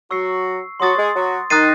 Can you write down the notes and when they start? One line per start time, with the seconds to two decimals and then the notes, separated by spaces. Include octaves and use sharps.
0.11 F#3 F#4 C#6 E6 C7
0.80 F#3 F#4 C6 D#6 A6
0.97 G#3 G#4
1.15 F#3 F#4
1.50 D#3 D#4 D#6 F#6 A6 C7 D#7